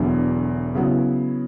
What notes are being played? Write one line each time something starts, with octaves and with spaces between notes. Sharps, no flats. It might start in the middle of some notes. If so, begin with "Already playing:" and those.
Already playing: E1 E2 D3 F#3
C#3 F#3 B3 E4